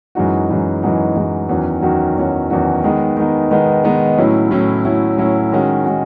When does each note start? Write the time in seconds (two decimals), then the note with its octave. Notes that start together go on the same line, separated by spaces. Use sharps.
0.15 F#2 E3 G#3 D#4 F#4
0.49 F#2 E3 G#3 D#4 F#4
0.83 F#2 E3 G#3 D#4 F#4
1.15 F#2 E3 G#3 D#4 F#4
1.49 E2 D#3 F#3 C#4 F#4
1.82 E2 D#3 F#3 C#4 F#4
2.17 E2 D#3 F#3 C#4 F#4
2.50 E2 D#3 F#3 C#4 F#4
2.84 D#3 G#3 B3 D#4
3.17 D#3 G#3 B3 D#4
3.51 D#3 G#3 B3 D#4
3.84 D#3 G#3 B3 D#4
4.17 A2 F#3 C#4 E4
4.51 A2 F#3 C#4 E4
4.85 A2 F#3 C#4 E4
5.17 A2 F#3 C#4 E4
5.52 D#3 G#3 C#4 F#4
5.84 D#3 G#3 C#4 F#4